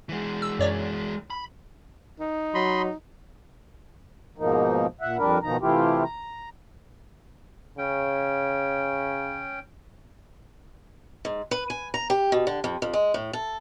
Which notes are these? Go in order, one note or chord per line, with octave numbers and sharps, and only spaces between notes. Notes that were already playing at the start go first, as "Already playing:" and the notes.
E3 G#3
E6
F#2 C#5 D5
B5
D#4
F#3 D#5 B5 C6
G#2 B2 F3 A#3 D#4
A#2 E5 F#5
F2 G3 D4 A#4 B4
B2 D#3 F3 D#4 A#5
C3 E3 A3 E4 F4 G4
A#5
C#3 C#4 G5
G#2
B4
G#5
A#5
G4
B2
D3
F2
F2
G#3
A2
A4